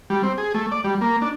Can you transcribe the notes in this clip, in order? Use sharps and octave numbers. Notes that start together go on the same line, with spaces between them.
G3
C4
G#4
A3
D5
G3
A#3
D4